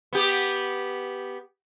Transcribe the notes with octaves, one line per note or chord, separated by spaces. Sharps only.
B3 G4